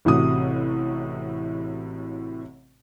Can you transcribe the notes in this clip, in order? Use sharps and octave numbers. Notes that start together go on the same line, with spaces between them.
A1 A2 C3 F#4 D#6